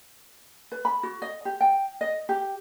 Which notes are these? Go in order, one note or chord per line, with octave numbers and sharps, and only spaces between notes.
B4
B5
F#4
D#5
G4
G5
D#5
G4